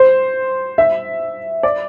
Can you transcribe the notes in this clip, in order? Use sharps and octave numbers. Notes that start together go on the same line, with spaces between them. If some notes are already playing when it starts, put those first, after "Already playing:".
Already playing: C5
E5
D5